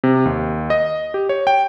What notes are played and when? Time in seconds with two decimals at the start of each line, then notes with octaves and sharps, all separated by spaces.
0.04 C3
0.25 D#2
0.70 D#5
1.14 G4
1.29 C#5
1.47 G5